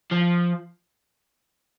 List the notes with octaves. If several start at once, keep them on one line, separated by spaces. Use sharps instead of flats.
F3